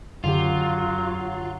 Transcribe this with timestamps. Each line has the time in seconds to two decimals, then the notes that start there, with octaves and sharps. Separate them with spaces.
0.24 F#2 D3 F#3 F4 G4